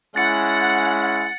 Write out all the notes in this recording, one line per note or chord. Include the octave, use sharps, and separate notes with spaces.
G#3 C#4 E4 F#5 A6 C#7